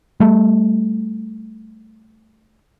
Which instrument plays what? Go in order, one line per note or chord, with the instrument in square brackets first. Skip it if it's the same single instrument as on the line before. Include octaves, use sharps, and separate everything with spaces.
[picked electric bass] G3 A3